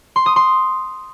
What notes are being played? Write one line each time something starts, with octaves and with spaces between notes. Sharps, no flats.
C6
D#6
C6